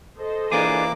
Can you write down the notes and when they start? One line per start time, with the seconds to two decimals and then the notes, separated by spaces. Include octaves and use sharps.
0.18 A4 C5 D#5
0.52 E3 A#3 D4 F4 G#4 D6